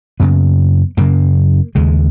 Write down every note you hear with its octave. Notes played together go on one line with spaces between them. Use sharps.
F#2 C#3 B3
F#2 C#3 A#3
D#2 C#3 G#3